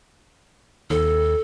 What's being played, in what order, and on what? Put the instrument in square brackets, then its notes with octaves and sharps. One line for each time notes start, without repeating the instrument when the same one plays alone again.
[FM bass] D#2 [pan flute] A4